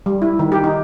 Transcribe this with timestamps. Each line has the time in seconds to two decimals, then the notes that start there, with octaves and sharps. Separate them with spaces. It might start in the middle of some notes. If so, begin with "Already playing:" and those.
0.06 G3
0.22 E4
0.39 D#3
0.52 G4
0.64 D#4